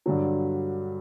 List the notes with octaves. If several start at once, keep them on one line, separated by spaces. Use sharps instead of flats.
G2 D3 F#3